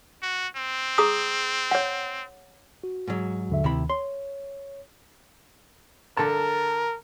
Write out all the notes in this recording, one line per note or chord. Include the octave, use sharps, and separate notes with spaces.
F#4
C4
G#4 A#5 D#6
C#5 F#5
F#4
G#2 F#3
D#2 D3 E5
D2 C3 D#3 E4 B5
C#5 C6
D3 A4 A#4 A5